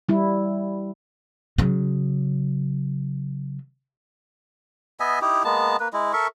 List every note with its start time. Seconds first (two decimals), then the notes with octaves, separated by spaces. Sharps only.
0.09 G3 E4
1.58 C#3 F#3
5.00 B3 D#5 E5 G#5
5.22 D#4 E4 G4
5.44 G#3 A#3 B3 A5
5.80 A#3 B4
5.93 G#3 E4
6.13 A4 A#4 E5 C#6